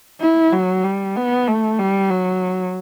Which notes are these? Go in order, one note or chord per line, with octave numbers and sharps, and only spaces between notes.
E4
F#3
G3
B3
A3
G3
F#3